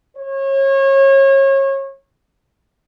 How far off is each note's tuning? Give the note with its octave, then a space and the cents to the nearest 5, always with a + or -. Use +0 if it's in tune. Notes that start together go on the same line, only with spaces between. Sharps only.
C#5 -30